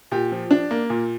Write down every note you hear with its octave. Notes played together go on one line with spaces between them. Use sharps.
A#2 G4
F3
D4
A#3
A#2